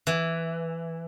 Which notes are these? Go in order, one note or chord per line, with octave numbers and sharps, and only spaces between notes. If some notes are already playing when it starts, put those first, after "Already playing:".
E3